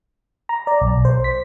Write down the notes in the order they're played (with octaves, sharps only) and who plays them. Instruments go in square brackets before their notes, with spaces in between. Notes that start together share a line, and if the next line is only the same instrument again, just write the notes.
[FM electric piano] A#5
D5
B1
C5
B6